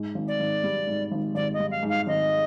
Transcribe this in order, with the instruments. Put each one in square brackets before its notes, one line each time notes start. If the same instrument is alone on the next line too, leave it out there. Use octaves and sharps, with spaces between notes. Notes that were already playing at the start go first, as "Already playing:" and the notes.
Already playing: [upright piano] G#2
G#1
[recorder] D5
[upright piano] G#1
G3
G#2
G#1
[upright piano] G#1 [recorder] D5
[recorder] D#5
[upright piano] G3
[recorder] F5
[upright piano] G#2
[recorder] F5
[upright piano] G#1 [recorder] D#5